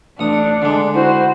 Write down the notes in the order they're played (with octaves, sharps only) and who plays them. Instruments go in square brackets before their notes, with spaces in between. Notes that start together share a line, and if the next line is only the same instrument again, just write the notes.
[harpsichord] A1 D#6 [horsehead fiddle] D4 [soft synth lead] C#7
[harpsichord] D3 G#3
[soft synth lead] E4 [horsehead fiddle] F#4 C5